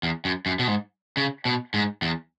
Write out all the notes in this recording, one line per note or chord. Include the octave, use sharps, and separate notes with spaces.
E2
F#2
F#2
B2
G#2
C#3
B2
G#2
E2